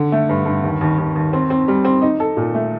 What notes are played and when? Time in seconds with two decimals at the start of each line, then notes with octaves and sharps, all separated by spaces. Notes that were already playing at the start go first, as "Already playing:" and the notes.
Already playing: D3
0.12 A3
0.29 G2
0.46 G2
0.64 D#2
0.81 D#2
0.98 D#2
1.16 D#2
1.33 C4
1.50 C4
1.68 G3
1.85 C4
2.02 D#4
2.20 A4
2.37 A#2
2.54 A3